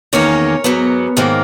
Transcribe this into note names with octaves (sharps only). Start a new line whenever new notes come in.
E2 D#3 A#3 C#4 A#4 C#5
G#2 F#3 B3
G#2 D#3 A#3